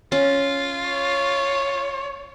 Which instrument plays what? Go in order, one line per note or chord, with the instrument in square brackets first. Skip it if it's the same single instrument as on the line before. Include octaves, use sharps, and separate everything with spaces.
[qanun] C#4 [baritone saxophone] F4
[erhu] C#5